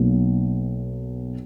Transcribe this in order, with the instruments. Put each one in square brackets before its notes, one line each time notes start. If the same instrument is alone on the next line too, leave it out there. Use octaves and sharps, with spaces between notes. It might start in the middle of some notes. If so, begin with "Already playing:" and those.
Already playing: [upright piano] B1 B2 A#3